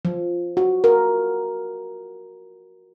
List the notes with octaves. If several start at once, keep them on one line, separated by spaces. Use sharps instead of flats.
F3
F#4
A#4